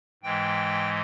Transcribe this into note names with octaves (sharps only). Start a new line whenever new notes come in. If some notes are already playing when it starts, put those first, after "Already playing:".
G#2 E3 G#3 G5